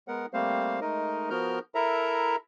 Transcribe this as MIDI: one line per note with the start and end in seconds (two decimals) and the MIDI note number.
0.08 0.26 56
0.08 0.26 59
0.08 0.26 70
0.08 0.26 78
0.33 0.80 55
0.33 0.80 57
0.33 0.80 58
0.33 0.80 60
0.33 0.80 72
0.33 0.80 77
0.81 1.30 56
0.81 1.30 57
0.81 1.30 63
0.81 1.30 70
0.81 1.30 75
1.30 1.59 53
1.30 1.59 59
1.30 1.59 66
1.30 1.59 70
1.30 1.59 89
1.30 1.59 91
1.75 2.36 64
1.75 2.36 69
1.75 2.36 70
1.75 2.36 76
1.75 2.36 82